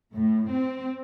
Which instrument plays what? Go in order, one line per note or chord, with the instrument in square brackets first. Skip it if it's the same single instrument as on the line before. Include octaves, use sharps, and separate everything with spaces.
[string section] A2
C4